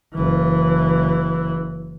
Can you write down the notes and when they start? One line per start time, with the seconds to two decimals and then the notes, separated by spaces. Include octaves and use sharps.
0.15 F#1 E3